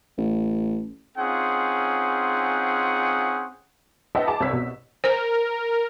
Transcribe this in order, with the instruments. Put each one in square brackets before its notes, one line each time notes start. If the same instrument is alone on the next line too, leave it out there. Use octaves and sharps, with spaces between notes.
[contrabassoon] A1
[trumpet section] C4 C#4 D#4 F4 G#4 F#5
[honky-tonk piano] B4 D#5 E5 F#5 G5 A5
G#4 G#5 A5 B5 D6
C2 C#5 D5 E6 B6
B2
[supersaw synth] A#4 [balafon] C5